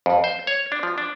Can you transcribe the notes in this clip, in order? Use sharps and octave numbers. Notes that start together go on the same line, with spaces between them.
F2
C5
C#5
D4
F3
D4